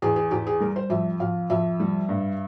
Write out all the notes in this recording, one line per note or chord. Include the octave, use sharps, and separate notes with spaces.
E2 G#4
G#4
E2 G4
G#4
G3 A#4
C5
F2 E5
F2 F5
F2 E5
G3
G2